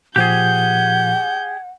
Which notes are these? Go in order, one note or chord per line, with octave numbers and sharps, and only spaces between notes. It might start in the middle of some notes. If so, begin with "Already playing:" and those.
A#2 F3 G4 G#4 F#5 G6